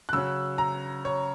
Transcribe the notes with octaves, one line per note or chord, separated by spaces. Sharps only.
F#6
C#3 F#3 C#4 E6
A#5
C#5